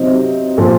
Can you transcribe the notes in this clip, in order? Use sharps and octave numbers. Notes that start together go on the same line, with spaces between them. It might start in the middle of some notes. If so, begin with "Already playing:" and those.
Already playing: C3 F#3 C4 D#4
A#2 F3